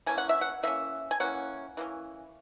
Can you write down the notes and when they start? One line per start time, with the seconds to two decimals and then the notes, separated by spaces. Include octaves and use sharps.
0.06 E3 A#3 C#4 G#5
0.18 F#5
0.29 E5
0.41 F#5
0.63 E3 A#3 C#4 E5
1.11 G#5
1.20 E3 A#3 C#4 F#5
1.77 E3 A#3 C#4